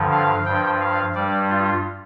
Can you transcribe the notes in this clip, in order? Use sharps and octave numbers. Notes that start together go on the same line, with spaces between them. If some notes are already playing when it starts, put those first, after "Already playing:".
Already playing: G2 D3 F3
F5
G2 F3 G5
F5
G2 G3 D5
F4